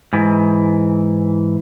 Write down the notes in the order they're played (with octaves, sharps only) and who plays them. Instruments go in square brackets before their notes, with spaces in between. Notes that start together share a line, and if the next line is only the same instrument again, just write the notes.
[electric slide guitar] G#2 E3